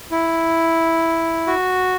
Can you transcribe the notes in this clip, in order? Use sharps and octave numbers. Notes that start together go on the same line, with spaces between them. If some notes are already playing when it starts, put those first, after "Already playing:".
E4
F#4